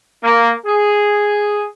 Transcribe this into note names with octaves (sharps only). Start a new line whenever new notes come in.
A#3
G#4